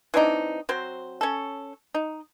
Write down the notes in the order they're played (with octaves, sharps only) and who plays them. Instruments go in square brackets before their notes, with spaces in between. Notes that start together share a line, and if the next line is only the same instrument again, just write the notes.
[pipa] E3 C4 D4 D#4
F#3 C4 C5
C#4 A4
D#4